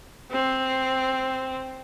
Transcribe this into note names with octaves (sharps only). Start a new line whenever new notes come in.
C4